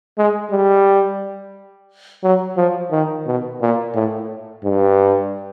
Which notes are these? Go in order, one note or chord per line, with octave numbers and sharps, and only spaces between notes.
G#3
G3
F#3
F3
D#3
B2
A#2
A2
G2